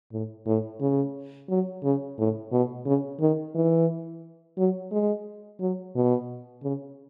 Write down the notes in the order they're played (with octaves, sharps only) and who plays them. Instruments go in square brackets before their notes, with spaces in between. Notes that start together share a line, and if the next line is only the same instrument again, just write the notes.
[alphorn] A2
A2
C#3
F#3
C#3
A2
B2
C#3
D#3
E3
F#3
G#3
F#3
B2
C#3